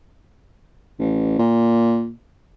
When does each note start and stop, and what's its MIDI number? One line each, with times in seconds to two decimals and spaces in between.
0.99 1.37 33
1.39 2.11 46